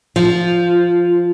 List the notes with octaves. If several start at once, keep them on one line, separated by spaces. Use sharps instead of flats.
F3